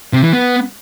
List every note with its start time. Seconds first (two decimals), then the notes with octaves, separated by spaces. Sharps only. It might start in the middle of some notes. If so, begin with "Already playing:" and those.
0.13 C3
0.23 E3
0.33 B3